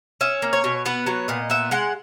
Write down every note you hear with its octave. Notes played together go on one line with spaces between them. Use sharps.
C#4 E5
A#3
C#5
B2
B3 B4
F#3 C#5
A#2 D#5
B3 E5
G#3 F#5